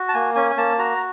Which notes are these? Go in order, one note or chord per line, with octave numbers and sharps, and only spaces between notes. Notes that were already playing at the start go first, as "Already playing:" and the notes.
Already playing: F#4
A5
A#3 G#5
C#4 G#5
G#5
A#3 A5
F#4 A#5